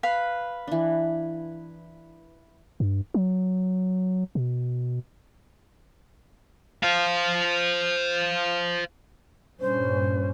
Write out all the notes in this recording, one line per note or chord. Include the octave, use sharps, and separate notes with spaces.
B4 F5 B5
E3 D4
G2
F#3
B2
C5 F5
G2 A#2 C#4 C5